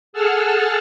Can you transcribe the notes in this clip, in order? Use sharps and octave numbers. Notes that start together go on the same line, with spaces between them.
G#4 A4 F#5 A5 E6 F6